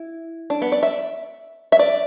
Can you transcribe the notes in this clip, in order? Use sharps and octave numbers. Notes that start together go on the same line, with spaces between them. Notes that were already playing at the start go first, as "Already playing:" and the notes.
Already playing: E4
D4
B3
D5
E5
E5
D5